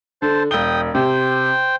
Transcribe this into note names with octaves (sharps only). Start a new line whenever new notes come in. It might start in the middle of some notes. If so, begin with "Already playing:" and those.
D3 C5 A5
E1 G5 D#6 G7
C3 C5 G5